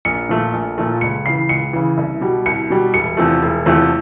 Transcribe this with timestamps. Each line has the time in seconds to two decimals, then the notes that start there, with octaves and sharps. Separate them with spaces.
0.05 A#1 C#7
0.29 A#2 F3 A3
0.53 A#1
0.78 A#2 F3 A3
1.01 C#2 C#7
1.26 C#3 E3 C7
1.49 C#2 C#7
1.73 C#3 E3
1.97 C2
2.21 B2 G3
2.46 C2 C#7
2.70 B2 G3
2.94 E1 C#7
3.17 E2 C3 F3 A3
3.42 E1
3.66 E2 C3 F3 A3